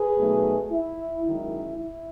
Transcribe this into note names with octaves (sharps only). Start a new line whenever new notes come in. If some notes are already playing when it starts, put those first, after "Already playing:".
Already playing: G#4 B4
B2 F#3 A3 D#4
E4
F#2 D#3 G#3 E4
E4